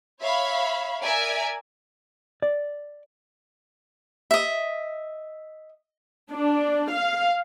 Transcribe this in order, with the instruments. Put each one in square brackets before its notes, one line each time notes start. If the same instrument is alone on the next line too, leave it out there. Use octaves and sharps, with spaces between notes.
[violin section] C#5 E5 F5 B5
A#4 D5 E5 G#5
[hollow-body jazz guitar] D5
[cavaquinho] D#5 E5
[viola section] D4
F5